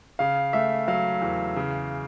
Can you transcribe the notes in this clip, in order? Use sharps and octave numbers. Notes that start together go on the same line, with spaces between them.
C#3 F5
A3 E5
F#3 F5
E2
C#3